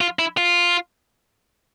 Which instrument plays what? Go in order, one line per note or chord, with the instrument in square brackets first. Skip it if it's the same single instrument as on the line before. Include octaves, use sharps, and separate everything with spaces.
[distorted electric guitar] F4
E4
F4